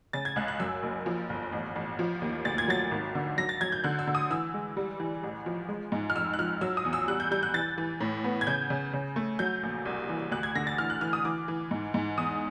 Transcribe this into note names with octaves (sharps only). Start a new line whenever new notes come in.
C#3 A6
G#6
C#2 F#6
F#6
F#2 E6
F#1
F3
G1
A1
A1
F3
D#2
D2 A6
G#6
F#3 A6
G#1
D3
F#3 A#6
A6
F#3 G#6
G6
D3 F#6
E6
D3
D#6
E3 E6
G#3
G3
E3
A1
F3
G#3
G#2
F6
F2 E6
F#6
F3 F6
F#3 E6
D#6
E2
E6
G3 F#6
G6
G3 G6
F#6
E3 A6
E3
A2
B3
G#6
C#3 G6
C#3
C#3
A3
F#3 G6
A#1
C2
E3
D2 F#6
G#6
D3 A#6
A6
E3 F6
F#6
E3 F6
D#6
E3 D6
E3
G#2
G#2
E2 D#6